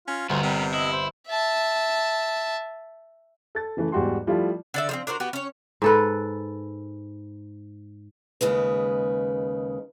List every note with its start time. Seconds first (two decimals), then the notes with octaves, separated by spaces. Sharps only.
0.08 C#4 F4
0.29 G1 D2 B3 A#4 C5
0.43 C3 G3
0.74 E4 D#5 E6 C#7 E7
0.93 C5
1.28 E5 A5
3.55 A4 A6
3.77 C#3 E3 A3
3.92 E2 G#2 G3 F#4 G5 C6
4.27 F3 G3 A3 E4 F4
4.74 D3 D5 E5
4.89 F3 G#3 C4
5.07 D4 F#4 A#4 C5
5.20 B3 F#4 G4
5.33 C#4 C#5
5.82 G#2 A4 B4
8.41 D#2 C#3 G#3 B4